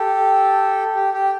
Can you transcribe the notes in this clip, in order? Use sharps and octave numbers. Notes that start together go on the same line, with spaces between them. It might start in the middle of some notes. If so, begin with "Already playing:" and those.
Already playing: G4 A4
G4
G4